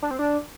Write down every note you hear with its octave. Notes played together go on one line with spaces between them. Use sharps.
D4
C4
D4